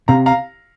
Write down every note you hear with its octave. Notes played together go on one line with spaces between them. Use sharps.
C3 F5 A#5
F5 A#5